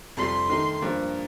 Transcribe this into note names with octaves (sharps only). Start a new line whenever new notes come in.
F2 C3 G3 C6
D#3 A3 D#4
G2 F3 A#3